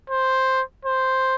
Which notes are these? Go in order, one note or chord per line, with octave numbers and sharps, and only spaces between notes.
C5
C5